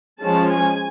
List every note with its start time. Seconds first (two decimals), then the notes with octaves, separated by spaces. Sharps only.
0.21 F3 G#3 C#4 A5
0.50 G#5